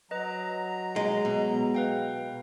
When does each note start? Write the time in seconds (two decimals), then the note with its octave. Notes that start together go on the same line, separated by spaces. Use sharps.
0.11 F#3 B4 D#5 A#5
0.96 G#3
1.25 B2
1.74 B4 F5 G5